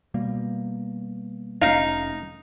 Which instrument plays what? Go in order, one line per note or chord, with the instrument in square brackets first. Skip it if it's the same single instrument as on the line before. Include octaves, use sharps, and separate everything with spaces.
[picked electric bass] B2 G3 A#3
[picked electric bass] F1 A3 C#4 [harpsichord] D#4 [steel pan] F5